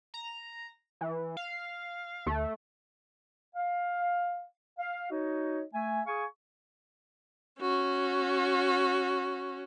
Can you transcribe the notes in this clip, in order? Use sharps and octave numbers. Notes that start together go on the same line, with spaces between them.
A#5
E3
F5
D2 A3
F5
F5
D#4 F#4 C#5 D#5
A3 E5 G#5
G#4 F5 G#5 C#6
C#4 F#4